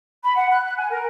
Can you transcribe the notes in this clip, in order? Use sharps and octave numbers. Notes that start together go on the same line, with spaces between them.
B5
F#5
F#6
F#6
G#5
A#4